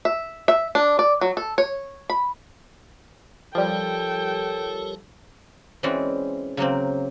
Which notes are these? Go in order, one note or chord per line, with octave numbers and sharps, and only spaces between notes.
E5
E5
D4
D5
F#3
A4
C#5
B5
F3 G3 G4 A4 A#4 C#5 G5
E3 G#3 C4 C#4 F#4 D5
C#3 F#3 A#3 C4